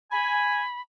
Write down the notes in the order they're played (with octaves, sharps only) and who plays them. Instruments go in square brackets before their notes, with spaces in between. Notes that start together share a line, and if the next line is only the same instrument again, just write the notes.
[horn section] G#5 [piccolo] B5